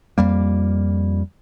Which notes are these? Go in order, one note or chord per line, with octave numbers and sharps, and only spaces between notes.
F2 G3 A#3